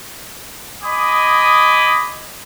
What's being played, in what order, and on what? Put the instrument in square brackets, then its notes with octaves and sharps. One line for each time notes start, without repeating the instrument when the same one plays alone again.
[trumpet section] D#5 G#5 B5 D6 D#6